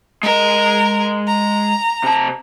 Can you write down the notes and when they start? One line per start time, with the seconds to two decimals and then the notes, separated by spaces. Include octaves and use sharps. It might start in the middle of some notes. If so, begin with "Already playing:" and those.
0.23 G#3 A#4 D#5
1.28 A#5
2.04 C3 A5